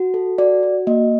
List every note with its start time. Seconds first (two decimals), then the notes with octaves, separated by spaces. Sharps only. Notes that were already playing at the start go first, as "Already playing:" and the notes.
Already playing: F#4
0.14 A4
0.38 F#4 D5
0.63 F#4
0.87 A#3 D#5